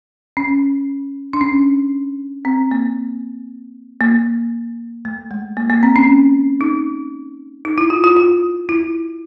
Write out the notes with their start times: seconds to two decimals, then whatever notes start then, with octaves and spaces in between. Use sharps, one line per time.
0.37 C#4
1.33 D4
1.41 C#4
2.45 C4
2.71 A#3
4.01 A#3
5.05 A3
5.31 G#3
5.57 A#3
5.70 A#3
5.83 C4
5.96 C#4
6.61 D#4
7.65 D#4
7.78 E4
7.90 F4
8.04 F4
8.17 F4
8.69 E4